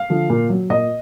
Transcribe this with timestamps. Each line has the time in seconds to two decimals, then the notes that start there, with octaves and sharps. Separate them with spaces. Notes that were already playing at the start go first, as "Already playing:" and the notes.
Already playing: F5
0.10 D3 F3
0.30 A#2
0.49 F#3
0.70 A#2 D#5